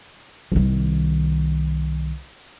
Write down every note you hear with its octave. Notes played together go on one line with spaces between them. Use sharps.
C2 D#3